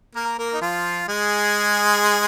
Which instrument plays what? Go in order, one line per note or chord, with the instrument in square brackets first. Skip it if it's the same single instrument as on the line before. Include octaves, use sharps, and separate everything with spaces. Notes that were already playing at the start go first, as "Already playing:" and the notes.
[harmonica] A#3 A#4
A#3 A#4
D#4
F3 F4
G#3 G#4